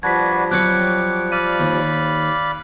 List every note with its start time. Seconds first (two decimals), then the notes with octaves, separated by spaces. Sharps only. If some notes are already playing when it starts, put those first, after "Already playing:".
0.03 F3 G3 D4 F#4 B4 G#6 B6
0.51 F#3 C4 B4 D6 F#6 G#6 C#7
1.32 D5 F5 B5 D#7
1.60 D#2